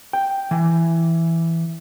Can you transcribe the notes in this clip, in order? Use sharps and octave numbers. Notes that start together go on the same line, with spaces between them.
G5
E3